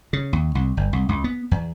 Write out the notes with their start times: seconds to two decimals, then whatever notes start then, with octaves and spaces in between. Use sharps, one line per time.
0.13 C#3
0.33 D#2
0.55 C2
0.77 G1
0.93 C2
1.09 C#2
1.24 B3
1.51 E2